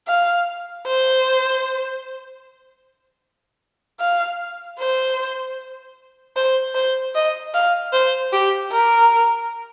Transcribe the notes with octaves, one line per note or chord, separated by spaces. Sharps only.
F5
C5
F5
C5
C5
C5
D#5
F5
C5
G4
A#4